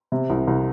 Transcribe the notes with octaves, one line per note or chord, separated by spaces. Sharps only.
C3
C2
C2